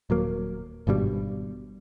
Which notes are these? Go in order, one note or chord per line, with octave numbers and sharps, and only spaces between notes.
D#1 F#3 A#3
G#1 G2 B2 G3